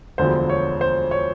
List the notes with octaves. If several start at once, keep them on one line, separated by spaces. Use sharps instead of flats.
E1 D2 D3 F3 C5
C#5
C5
C#5